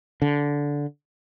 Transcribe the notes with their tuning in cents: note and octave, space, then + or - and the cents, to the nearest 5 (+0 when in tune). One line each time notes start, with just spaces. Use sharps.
D3 -15